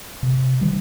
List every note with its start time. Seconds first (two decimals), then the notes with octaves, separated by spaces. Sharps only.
0.23 C3
0.61 D#3 G3